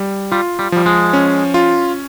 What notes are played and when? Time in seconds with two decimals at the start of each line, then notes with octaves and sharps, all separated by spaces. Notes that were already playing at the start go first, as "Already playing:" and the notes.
Already playing: G3
0.32 G3 F4
0.59 G3
0.72 F3 G3
0.86 G#3
1.13 C#4
1.54 F4